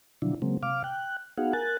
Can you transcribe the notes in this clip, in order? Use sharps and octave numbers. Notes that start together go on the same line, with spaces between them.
B2 D3 F3 F#3 D4 E4
C#3 F#3 G#3 A#3 C4
C3 F5 D6 F6
G5 F#6
B3 D#4 F#4 G#4 F5 F#5
A#4 G#5 F#6 A6